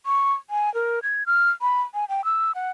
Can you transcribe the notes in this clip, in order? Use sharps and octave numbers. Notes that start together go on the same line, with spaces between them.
C#6
G#5
A#4
G#6
F6
B5
G#5
G5
E6
F#5